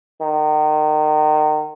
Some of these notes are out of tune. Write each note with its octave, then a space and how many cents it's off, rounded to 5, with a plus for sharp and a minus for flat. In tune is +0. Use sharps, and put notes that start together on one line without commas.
D#3 -30